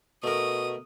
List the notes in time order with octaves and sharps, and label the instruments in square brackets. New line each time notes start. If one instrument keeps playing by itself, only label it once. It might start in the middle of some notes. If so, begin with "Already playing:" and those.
[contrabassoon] B2 [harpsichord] A3 A#4 [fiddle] D#6